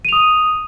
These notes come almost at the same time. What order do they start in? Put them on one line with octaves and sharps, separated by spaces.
D#7 F7 D#6